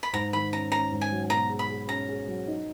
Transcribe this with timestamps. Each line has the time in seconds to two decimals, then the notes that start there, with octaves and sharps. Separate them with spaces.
0.03 B5
0.13 G#2 A#5
0.33 D#3 B5
0.53 C#4 A#5
0.71 C#4 A#5
0.91 G#2
1.01 G#5
1.11 F#3
1.30 B2 A#5
1.50 G#4
1.59 B5
1.68 G#4
1.88 C#4 A#5
2.08 G#4
2.27 F#3
2.47 D#4